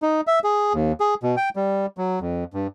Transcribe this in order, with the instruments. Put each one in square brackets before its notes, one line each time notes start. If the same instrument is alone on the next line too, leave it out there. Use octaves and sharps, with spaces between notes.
[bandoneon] D#4
E5
G#4
D#2
G#4
B2
G5
G3
F#3
F2
G2